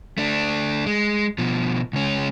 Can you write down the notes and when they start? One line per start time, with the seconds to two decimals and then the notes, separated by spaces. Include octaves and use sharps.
0.18 A3 D4
0.86 G#3
1.38 B2 F3
1.93 C#2 C#4